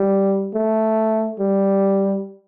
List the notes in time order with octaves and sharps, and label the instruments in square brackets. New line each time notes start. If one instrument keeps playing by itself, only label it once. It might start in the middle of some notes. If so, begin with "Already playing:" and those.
Already playing: [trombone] G3
A3
G3